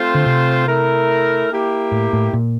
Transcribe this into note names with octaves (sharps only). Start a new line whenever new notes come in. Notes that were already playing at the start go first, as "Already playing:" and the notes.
Already playing: A3 C4 F4 C5
D3
C3
A3 E4 A#4
A#3 E4 G4
A2
A2
A#2